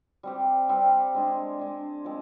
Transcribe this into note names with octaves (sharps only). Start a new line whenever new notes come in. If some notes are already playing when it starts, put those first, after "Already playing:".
G3 C4 G4
G3 C4 G4
G#3 D4 G#4
G#3 D4 G#4
F3 G#3 C4